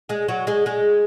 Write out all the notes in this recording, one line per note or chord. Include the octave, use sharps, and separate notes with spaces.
G#3 G#4
F#3 F#4
G#3 G#4
G#3 G#4